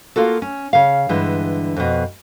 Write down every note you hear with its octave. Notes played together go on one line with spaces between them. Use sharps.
A#3 F4 F#4 A4
C#4
C#3 F5
G2 D3 E3 G#3
F2 B2